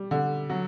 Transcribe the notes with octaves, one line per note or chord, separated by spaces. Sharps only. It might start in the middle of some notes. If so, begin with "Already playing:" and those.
Already playing: G3
D3
F#3